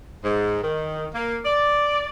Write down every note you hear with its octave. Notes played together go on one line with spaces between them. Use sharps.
G#2
D#3
A#3
D5